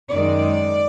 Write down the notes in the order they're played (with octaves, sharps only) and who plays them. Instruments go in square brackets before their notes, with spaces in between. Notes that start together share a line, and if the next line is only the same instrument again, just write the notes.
[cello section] F#2 D#3 G#3 D5